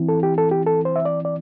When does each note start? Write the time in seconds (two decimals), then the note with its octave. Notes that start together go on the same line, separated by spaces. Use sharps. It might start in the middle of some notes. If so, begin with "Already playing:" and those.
Already playing: E3 C4 E4
0.09 A4
0.23 G4
0.38 A4
0.51 G4
0.66 A4
0.85 C5
0.96 E5
1.05 D5
1.25 D5